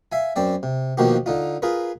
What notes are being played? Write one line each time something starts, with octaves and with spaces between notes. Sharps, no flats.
E5 F5 G#5
F#2 C4 D5 G5
C3
B2 D#3 F3 A#3 F#4 G4
D3 D#4 F4
F4 G#4 A#4 B4